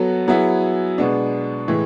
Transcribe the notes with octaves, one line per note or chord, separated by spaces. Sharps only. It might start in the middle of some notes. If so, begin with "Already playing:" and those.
Already playing: F#3 B3 F#4 A4
F#3 B3 E4 G#4
B2 G#3 B3 D4
A2 E3 G#3